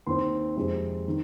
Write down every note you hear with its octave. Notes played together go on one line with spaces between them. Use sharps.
D#2 D#3 C4 C6
F2 C3 G#3 C4
D#3